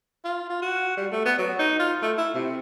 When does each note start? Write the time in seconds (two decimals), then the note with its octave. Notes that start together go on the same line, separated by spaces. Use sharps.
0.25 F4
0.50 F4
0.62 F#4
0.97 G3
1.12 A3
1.25 B3
1.38 F#3
1.59 D#4
1.79 F4
2.02 A3
2.18 E4
2.34 C3